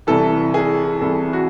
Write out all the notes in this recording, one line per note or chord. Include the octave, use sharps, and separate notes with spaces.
C2 C3 E3 A4
G#4
C2 C3 E3 A4
F#4